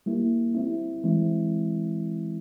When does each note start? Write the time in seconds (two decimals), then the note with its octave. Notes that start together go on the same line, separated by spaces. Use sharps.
0.06 G3 A#3 E4
0.55 G3 C4 E4
1.04 E3 G#3 C4 E4